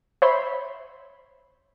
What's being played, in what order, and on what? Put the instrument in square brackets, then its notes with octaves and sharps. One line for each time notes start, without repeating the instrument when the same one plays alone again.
[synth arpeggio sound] C5 C#5 E5 B5 C6